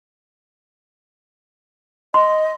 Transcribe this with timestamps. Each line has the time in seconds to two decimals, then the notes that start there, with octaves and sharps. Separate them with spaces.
2.14 D#5 C6